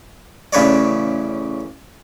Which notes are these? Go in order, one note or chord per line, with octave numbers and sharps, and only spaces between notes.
A1 C#3 B4 C#5 D5